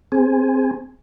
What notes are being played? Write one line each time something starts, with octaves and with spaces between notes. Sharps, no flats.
C4 G#4